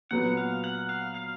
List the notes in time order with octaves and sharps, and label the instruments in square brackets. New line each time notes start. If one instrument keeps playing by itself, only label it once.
[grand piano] A#2 F#3 B3 [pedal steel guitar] F#5
[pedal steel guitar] F5
F#5
F5
F5